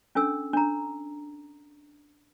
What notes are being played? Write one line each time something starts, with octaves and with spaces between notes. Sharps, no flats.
C#4 D4 A4 E6
D4 A#5